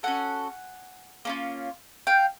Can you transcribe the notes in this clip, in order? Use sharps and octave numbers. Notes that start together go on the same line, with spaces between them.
C#4 F#4 A4 F#5 G#5
A#3 C#4 F4
F5 G5